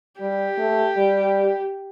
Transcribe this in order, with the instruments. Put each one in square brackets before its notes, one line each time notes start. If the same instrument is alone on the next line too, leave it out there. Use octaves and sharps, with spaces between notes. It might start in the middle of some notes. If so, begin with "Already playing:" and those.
[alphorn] G3 [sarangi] G4
[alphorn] A3
G3